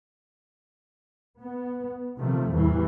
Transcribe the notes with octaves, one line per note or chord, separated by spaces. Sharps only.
B3
C3 D#3 F3 A3
E2 A2 E3 G3